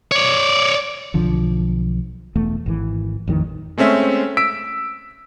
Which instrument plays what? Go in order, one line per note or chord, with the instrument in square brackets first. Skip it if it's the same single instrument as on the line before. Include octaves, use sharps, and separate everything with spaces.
[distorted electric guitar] C#5 D5
[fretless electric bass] B1 D3 F3
E1 E2 A3
G#1 E3
A1 F2 D#3 E3
[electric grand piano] G#3 A3 C4 C#4 E5
E6 B6 D7